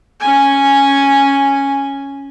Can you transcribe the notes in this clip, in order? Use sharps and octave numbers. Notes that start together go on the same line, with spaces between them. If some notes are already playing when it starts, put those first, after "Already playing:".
C#4 G#5